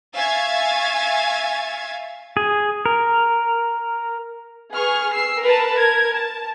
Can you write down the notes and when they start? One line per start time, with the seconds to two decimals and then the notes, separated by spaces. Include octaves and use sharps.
0.17 E5 F5 G#5 C#6 G#6 A6
2.37 G#4
2.86 A#4
4.74 G#4 B4 C#6 F6
5.13 E6 C7
5.42 A#4 B4 A5
5.76 A#4 G#6
6.13 A5